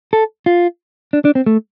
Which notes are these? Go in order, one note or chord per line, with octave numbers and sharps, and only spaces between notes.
A4
F4
D4
D4
C4
A3